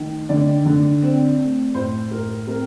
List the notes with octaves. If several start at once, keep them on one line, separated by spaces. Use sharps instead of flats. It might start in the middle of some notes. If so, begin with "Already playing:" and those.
Already playing: D#3 A3
D3 D5
D3
C4
A3
A2 C5
A2 A#4
C4 A#4